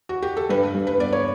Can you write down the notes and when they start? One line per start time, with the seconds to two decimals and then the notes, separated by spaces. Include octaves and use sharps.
0.09 F#4
0.22 G4
0.37 A4
0.49 G2 B4
0.74 G2
0.87 B4
0.98 B3 D5
1.13 C#5